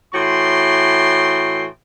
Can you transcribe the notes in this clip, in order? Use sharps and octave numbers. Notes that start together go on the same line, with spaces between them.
A2 E3 F#4 G5 C6